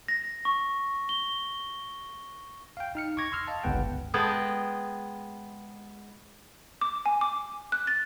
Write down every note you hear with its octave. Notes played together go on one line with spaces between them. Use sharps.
A#6
C#6
G7
F5 G5
D#4 F6 C#7
C#6 D6 G#6 A#6
C6 E6 F6
D#5 F5 A5
G1 C#2 B3 B4 F#5 G5
G#3 B3 G#4 D#5 G5 A5
D6
G#5
D6
F#6
A6